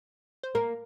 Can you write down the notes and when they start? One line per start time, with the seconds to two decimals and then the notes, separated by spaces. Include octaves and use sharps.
0.43 C5
0.55 A#3 A#4